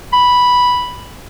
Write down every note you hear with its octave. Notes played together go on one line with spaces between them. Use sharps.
B5